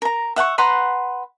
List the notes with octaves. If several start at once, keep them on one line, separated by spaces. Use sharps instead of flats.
A#4 A#5
E5 F#5 G5 C#6
B4 F#5 A#5 C6